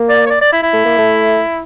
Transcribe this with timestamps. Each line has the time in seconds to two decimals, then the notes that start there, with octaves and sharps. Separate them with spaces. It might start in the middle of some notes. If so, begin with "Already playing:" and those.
Already playing: A#3
0.09 D5
0.26 C#5
0.30 D5
0.41 D5
0.52 E4
0.63 E4
0.73 A3
0.85 A#3
0.98 A3